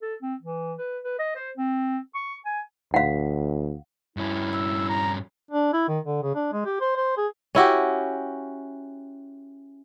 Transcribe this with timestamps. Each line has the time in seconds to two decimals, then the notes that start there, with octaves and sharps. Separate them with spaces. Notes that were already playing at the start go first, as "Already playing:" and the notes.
0.02 A4
0.22 C4
0.42 E3
0.78 B4
1.04 B4
1.19 D#5
1.35 C5
1.57 C4
2.15 C#6
2.45 G#5
2.94 D2 F5 F#5
4.17 G2 C#4 E4
4.54 E6
4.89 A#5
5.51 D4
5.73 E4
5.88 D#3
6.05 D3
6.22 C#3
6.35 D4
6.53 G#3
6.65 G4
6.81 C5
6.96 C5
7.17 G#4
7.55 C#4 E4 F#4 G4